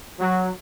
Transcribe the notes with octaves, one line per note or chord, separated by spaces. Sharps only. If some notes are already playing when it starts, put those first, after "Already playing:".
F#3